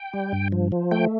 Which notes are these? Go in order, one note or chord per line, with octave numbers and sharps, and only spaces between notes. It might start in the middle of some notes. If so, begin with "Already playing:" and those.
Already playing: G5
G3
G2
F3
F3
A3 G5